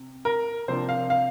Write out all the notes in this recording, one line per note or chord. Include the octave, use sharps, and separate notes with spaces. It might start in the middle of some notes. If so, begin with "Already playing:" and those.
Already playing: C3
A#4
C3 F3 A#3 D4 C5
F5
F5